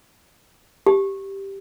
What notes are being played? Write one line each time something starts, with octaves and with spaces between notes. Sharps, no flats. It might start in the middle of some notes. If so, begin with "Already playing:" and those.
G4